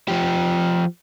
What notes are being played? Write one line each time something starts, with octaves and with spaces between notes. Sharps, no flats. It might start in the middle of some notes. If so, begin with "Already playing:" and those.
F3 G4